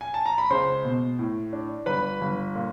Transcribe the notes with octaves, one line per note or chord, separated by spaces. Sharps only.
G#5
A5
A#5
B5
C#2 C5 C6
B2
A2
D4
G1 B4 B5
G1
A#2